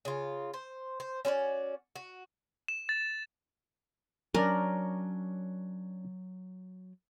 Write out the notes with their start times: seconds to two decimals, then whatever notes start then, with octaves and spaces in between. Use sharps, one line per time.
0.05 C#3 F4
0.54 C5
1.00 C5
1.25 C#4 F#4 C5 D5
1.95 F#4
2.68 E7
2.89 A6
4.34 F#3 C#4 D4 A#4 D5